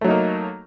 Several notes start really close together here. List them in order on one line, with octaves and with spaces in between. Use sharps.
A3 F#3 D#4 A#3